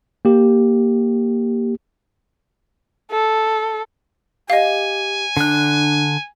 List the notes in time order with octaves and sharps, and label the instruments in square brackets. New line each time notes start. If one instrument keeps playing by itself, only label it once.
[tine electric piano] A#3 G4
[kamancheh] A4
[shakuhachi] G4 [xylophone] D#5 F5 [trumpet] G#5
[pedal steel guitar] D3 F#6 [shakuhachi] D4